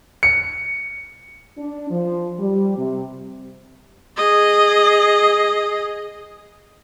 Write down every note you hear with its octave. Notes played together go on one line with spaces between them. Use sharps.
C#7
D4
F3
G3
C3
G#4 D#5